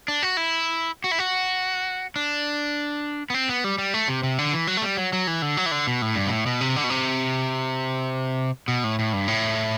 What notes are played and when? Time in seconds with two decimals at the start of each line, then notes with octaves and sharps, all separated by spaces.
0.08 D4
0.23 F#4
0.37 E4
1.04 F#4
1.11 E4
1.19 F#4
2.16 D4
3.30 B3
3.34 C4
3.49 B3
3.64 G3
3.78 G3
3.94 A3
4.08 C3
4.23 C3
4.38 D3
4.53 E3
4.67 F#3
4.77 A3
4.82 G3
4.97 F#3
5.13 F#3
5.27 E3
5.42 D3
5.57 F#3
5.66 E3
5.71 D3
5.87 B2
6.02 A2
6.16 G2
6.27 B2
6.31 A2
6.46 B2
6.61 C3
6.76 D3
6.84 B2
6.90 C3
8.68 B2
8.84 A2
8.99 A2
9.13 G2
9.28 A2